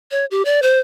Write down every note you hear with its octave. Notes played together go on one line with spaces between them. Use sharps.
C#5
G4
D5
C5